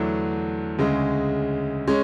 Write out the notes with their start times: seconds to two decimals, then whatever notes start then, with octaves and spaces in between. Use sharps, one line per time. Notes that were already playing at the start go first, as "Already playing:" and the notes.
Already playing: E2 D3 F#3 A3 D4
0.79 D2 C#3 G#3
1.87 G#3 C#4